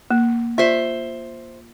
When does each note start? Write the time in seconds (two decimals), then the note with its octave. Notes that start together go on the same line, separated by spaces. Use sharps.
0.11 A#3
0.58 F4 C5 E5